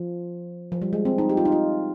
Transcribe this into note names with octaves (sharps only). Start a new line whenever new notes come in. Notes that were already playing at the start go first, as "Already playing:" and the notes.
Already playing: F3
F3
G3
G#3
C4
D#4
G4
F4
D#4
F4